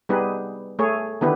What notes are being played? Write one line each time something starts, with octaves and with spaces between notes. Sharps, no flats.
G3 B3 D#4 G4 G#4 B4
A3 G#4 C#5
D3 D#3 B3 E4 G4 B4